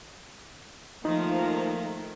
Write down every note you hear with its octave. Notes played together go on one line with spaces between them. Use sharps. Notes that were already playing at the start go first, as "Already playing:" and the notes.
D#3 F3 A3 A#3 D#4 A#5